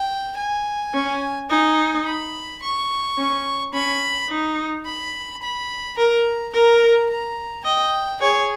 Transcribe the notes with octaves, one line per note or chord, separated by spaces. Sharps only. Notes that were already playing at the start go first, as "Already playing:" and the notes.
Already playing: G5
G#5
C#4
D#4 G#5
B5
C#6
C#4
C#4 B5
D#4
B5
B5
A#4 A#5
A#4 A#5
A#5
D#5 G5
G#4 C#5